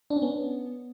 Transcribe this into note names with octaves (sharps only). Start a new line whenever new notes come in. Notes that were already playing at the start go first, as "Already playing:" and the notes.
D4
C#4
B3